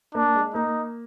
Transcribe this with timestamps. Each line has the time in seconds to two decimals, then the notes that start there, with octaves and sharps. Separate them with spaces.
0.15 A#3 D4
0.35 G#3
0.55 A#3 D#4